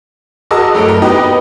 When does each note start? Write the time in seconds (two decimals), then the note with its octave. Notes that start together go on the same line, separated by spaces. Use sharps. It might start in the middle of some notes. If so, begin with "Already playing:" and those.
0.51 F#4 G#4 A#4 D#5 A5 E6
0.74 G2 F#3 A3 A#4 D7
0.89 A#4
1.02 B3 D#4 G4 B4 D#5